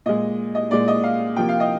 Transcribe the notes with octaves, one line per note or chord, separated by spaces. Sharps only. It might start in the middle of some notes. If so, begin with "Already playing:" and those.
A#2 G#3 D#5
D#5
A#2 G#3 D5
D#5
F5
C3 F3 A#3 G5
F5
D#5